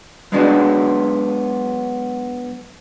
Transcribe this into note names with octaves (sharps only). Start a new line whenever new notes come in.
F#3 G#3 B3 D4 F#4